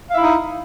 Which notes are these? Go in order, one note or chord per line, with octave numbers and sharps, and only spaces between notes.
D#4 E4 E5 F5